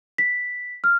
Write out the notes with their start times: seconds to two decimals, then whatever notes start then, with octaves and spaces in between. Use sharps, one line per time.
0.18 B6
0.84 F6